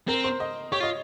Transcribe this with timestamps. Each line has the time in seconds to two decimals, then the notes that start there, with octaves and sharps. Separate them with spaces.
0.08 C4 A#4
0.24 C5
0.40 D#5
0.72 G4 C#5
0.80 F4 D#5